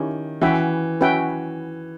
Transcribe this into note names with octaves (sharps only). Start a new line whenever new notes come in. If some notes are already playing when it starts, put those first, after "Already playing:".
Already playing: D#3 C#4 E4 G4 A#4 C#5
E3 C#4 F#4 B4 E5 G5
C#4 F#4 B4 E5 G5